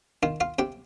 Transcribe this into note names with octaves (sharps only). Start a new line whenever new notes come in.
D#3 F4 F5
F4 F5
C3 G4 G5